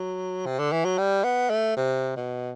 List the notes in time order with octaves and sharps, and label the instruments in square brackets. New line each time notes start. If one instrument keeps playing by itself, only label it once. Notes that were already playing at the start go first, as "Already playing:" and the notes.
Already playing: [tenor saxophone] F#3
C3
D3
E3
F#3
G3
B3
A3
C3
B2